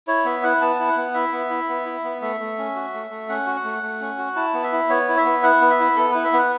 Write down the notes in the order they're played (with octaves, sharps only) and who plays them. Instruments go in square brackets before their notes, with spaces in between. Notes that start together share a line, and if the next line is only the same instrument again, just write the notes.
[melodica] E4 C#5
B3 E5
E4 F#5
B3 A5
E4
F#5
B3
E4 E5
B3
E4
B3
E4
B3
A3 E5
A3
C#4
F#4
A3
A3
C#4 F#5
F#4
F#5
A3
A3
C#4
F#4
E4 A5
B3
E5
E4
B3 C#5
E4
E5
B3
E4 F#5
B3
E5
E4
B3 A4
E4 B4
E5
B3 F#5